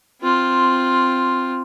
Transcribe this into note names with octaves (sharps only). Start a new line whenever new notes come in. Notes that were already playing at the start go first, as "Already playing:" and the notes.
C4 F4